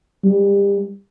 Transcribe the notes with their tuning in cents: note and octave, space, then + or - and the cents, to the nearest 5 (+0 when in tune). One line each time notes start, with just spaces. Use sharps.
G3 +30